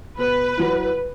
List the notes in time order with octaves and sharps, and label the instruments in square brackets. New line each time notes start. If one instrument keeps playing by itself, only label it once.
[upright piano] B2 [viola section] B4
[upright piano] F#3 E4